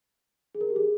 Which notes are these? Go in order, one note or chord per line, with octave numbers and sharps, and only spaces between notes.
G#4
A#4
G4
G#4